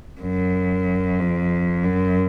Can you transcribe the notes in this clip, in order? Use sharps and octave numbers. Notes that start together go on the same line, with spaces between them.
F#2
F2
F#2